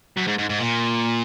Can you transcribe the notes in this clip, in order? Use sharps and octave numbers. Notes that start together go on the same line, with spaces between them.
F#2
G#2
G#2
G#2
A#2